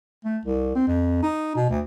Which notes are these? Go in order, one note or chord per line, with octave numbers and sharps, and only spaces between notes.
A3
C2
C4
F2
D#4
B2
D2